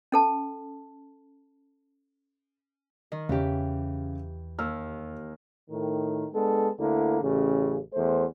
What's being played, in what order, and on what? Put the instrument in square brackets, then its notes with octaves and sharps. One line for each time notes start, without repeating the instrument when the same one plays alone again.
[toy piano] C#4 A4 A5
[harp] D#3
[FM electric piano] E2 [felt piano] C#3 C#4 [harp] E3 G4
[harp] D#2 [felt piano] E6 F6
[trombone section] A2 D#3
G#3 B3 D4 A4
D2 D3 A#3 E4
A1 C#3
E2 A3 C5